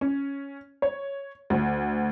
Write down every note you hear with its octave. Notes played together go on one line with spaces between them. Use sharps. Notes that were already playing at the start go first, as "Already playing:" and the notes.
C#4
C#5
D2